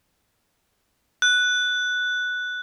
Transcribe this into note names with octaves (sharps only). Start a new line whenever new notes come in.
F#6